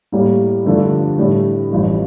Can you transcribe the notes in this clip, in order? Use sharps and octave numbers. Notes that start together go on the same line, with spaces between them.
A2 G3 A#3
G2 D3 F3 A3 D4
A2 G3 D4
A1 G2 F3